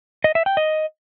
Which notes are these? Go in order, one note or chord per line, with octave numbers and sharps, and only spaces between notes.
D#5
E5
G5
D#5